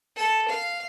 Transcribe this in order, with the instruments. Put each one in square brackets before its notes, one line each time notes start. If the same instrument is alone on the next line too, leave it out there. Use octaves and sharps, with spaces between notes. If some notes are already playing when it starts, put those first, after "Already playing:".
[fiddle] A4
F5